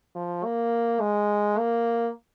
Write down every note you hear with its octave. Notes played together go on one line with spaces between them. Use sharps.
F3
A#3
G#3
A#3